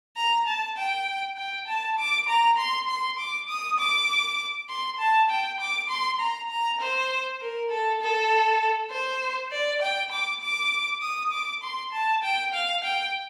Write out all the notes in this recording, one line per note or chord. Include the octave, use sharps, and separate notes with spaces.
A#5
A5
G5
G5
A5
D6
A#5
C6
C6
D6
D#6
D6
C6
A5
G5
D6
C6
A#5
A#5
C5
A#4
A4
A4
C5
D5
G5
D6
D6
D#6
D6
C6
A5
G5
F5
G5